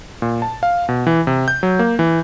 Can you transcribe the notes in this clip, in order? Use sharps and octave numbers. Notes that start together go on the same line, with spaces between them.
A#2
A5
F5
B2
E3
C3
G6
F#3
A#3
E3